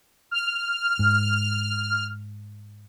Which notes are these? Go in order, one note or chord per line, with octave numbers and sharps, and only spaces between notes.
F6
G#2